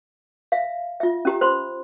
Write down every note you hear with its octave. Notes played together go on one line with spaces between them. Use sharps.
E5 F5
F4 E5
C#4 G4 A#5
C5 B5 C6